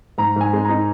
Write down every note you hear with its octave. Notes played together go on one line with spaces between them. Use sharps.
G#2 A#5
G#2 G#5
G#3
D#4 A#5